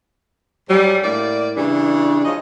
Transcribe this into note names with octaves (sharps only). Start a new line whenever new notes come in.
G#2 F#3 G3
A2 A#3 D5
C#3 E3 G3 D4
F3 G#3 C#5 D#5